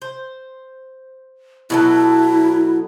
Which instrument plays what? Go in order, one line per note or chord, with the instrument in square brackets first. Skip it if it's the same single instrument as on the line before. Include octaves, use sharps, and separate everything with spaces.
[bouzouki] C5
[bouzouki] B2 F#3 A4 [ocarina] E4